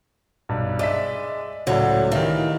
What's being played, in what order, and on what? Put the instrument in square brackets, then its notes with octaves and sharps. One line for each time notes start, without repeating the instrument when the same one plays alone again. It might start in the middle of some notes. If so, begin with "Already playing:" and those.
[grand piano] B1 G2
[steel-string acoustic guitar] G#3 [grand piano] D5 E5 B6
[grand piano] C#2 A2 D5 [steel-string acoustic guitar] F#3
[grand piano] D#3 G4 F5 [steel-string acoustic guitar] E3